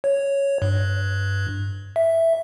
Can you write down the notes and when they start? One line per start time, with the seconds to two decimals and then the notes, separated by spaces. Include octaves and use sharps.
0.04 C#5
0.62 G2
1.96 E5